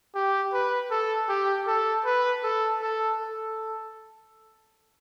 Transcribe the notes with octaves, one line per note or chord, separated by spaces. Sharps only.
G4
B4
A4
G4
A4
B4
A4
A4
A4